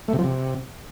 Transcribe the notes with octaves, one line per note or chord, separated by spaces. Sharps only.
A3
C3
F3
C3